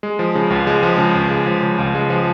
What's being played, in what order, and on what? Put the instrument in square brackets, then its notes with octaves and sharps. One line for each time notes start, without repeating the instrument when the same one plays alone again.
[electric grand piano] G#3
F3
C#3
C#2
G#3
F3
C#3
C#2
G#3
F3
C#3
C#2
G#3
F3